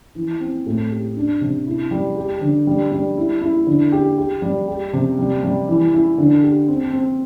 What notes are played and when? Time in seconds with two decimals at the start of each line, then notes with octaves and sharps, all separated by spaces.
0.15 E3
0.40 C4
0.66 A2
0.91 G4
1.17 D4
1.41 C3
1.66 E4
1.91 G3
2.16 G4
2.41 D3
2.67 G3
2.92 G3
3.17 E4
3.42 E4
3.67 D3
3.92 G4
4.18 G4
4.42 G3
4.68 G4
4.93 C3
5.18 G3
5.43 G3
5.68 E3
5.94 E4
6.18 D3
6.43 G4
6.68 C4
6.93 C4